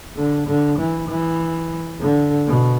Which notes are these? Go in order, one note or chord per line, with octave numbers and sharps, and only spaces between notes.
D3
D3
E3
E3
D3
B2